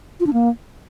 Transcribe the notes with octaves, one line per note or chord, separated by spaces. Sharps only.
F4
D4
A#3